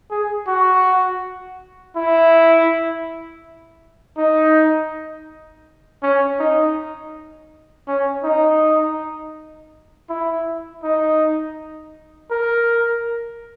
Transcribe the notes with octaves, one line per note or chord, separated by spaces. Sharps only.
G#4
F#4
E4
D#4
C#4
D#4
C#4
D#4
E4
D#4
A#4